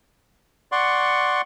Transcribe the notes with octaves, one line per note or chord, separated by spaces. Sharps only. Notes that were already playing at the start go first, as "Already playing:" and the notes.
D5 F#5 C6 C#6